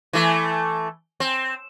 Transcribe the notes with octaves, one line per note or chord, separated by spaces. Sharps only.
E3 A3
C4